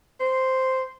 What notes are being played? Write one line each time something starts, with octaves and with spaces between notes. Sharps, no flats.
C5